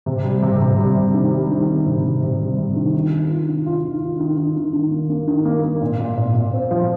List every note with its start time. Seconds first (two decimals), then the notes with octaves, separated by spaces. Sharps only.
0.06 C3
0.24 G3
0.42 C3
0.61 C3
0.79 G3
0.96 C3
1.14 D#3
1.32 G3
1.51 D#3
1.68 D#3
1.86 C3
2.04 C3
2.23 C3
2.40 G3
2.58 C3
2.76 D#3
2.94 D#3
3.12 D#3
3.30 F4
3.48 D#3
3.66 F4
3.84 D#3
4.01 F4
4.20 D#3
4.37 D#3
4.56 D#3
4.73 D#3
4.91 A#3
5.09 A#3
5.28 D#3
5.45 A#3
5.64 A#3
5.81 A#2
6.00 A#2
6.17 A#2
6.35 A#2
6.53 C4
6.71 F3